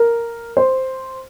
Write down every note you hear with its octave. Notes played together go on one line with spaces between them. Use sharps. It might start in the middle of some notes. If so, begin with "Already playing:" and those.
Already playing: A#4
C5